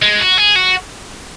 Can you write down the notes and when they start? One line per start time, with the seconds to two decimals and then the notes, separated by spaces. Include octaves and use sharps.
0.02 G#3
0.20 F#4
0.38 G#4
0.56 F#4